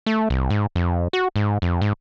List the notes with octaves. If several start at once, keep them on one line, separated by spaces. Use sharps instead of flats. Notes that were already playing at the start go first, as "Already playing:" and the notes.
A3
C2
G#2
F2
F#4
G#2
F2
G#2